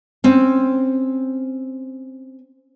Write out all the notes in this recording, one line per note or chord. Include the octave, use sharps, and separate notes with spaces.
C4 C#4